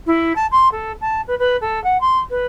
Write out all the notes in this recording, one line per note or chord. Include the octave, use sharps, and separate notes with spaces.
E4
A5
C6
A4
A5
B4
B4
A4
F#5
C6
B4